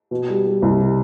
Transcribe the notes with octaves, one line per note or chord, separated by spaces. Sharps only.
B2
G3
G3
C2
G3